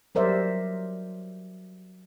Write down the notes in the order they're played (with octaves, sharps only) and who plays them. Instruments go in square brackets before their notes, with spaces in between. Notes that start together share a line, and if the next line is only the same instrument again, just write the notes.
[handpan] F#3 G3 A#4 C5 D5 E5